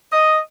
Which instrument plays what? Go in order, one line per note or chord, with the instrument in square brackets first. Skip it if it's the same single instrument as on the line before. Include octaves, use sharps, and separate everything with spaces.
[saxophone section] D#5